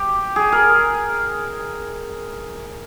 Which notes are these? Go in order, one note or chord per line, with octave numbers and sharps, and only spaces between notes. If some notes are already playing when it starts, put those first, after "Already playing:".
Already playing: G4
G#4
A#4